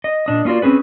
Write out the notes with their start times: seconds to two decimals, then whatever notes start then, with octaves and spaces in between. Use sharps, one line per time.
0.04 D#5
0.26 A#2 D4 D#5
0.45 A#3 C#4 F4 F#4 D5
0.62 C4 C#4 G#4 B4